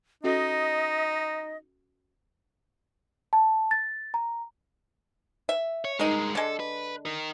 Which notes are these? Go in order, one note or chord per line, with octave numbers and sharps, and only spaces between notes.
C#4 D#4 F#4 A4 D#5
A5
A6
A#5
E5
C#5
G2 G#3 D#4 A#4
D3 G#3 A4
B4
D#4 A#4